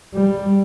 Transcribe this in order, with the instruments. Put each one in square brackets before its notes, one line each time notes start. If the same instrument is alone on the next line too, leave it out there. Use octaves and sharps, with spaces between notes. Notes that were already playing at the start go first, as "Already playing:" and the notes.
[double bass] G3